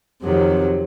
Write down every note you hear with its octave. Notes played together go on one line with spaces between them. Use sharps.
F2 C3 D#3 F#3